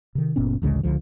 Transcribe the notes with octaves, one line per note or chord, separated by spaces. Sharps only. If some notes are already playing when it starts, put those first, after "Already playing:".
C3 D#3
F#1 A#2 B3 C#4
A1 D2 C#3 G#3
C#2 D3 F3